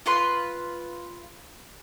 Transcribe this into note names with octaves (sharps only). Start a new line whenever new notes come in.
F4 B4 C6